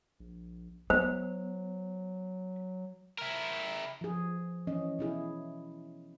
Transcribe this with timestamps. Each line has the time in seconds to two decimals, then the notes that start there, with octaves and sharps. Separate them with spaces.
0.20 A#1
0.90 F#3 B3 C5
3.18 E4 A#4
4.01 F3 G#4
4.67 E3 G#3 C#4 D#5
4.99 B2 E4 G#4